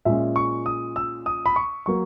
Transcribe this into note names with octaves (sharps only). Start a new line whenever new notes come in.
A#2 G#3 C#4 E5
C#6
D#6
E6
D#6
B5
C#6
F#3 A#3 C#6